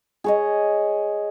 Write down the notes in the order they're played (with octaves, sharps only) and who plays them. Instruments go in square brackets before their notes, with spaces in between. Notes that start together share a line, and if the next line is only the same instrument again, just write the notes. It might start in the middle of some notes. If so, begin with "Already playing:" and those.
[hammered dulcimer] G#4 C#5 D#5